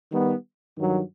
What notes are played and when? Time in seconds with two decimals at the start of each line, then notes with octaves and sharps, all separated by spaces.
0.11 D#3 G3 B3
0.77 G2 D#3 F#3